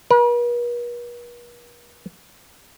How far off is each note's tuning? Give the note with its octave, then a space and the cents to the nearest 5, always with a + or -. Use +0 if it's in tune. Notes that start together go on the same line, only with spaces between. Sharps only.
B4 -45